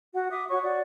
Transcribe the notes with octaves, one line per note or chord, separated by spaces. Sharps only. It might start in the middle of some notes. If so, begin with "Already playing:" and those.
F#4 F#5
E5 D6 D#6
F#4 C#5 C#6
F#4 D5